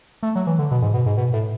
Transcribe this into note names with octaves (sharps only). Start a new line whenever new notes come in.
A3
F#3
E3
D3
B2
G#2
B2
G#2
B2
A2